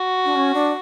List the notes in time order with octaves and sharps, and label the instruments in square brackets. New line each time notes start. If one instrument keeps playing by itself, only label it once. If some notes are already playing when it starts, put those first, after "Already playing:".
Already playing: [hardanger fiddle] F#4
[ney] D4
C#4
D4